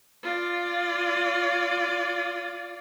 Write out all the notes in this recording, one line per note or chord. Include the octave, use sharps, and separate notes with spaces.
F4 D5